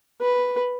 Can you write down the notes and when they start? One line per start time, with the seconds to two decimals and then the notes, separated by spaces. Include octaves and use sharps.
0.21 B4